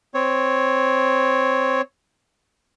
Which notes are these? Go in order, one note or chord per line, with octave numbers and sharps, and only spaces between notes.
C4 C#5